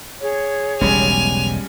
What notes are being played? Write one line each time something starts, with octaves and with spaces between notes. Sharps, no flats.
G#4 C#5
E1 B1 C#3 G3 G#3 C#4 G#5 F7